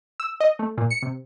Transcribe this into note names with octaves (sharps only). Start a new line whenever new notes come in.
E6
D#5
A3
A#2
C#7
C3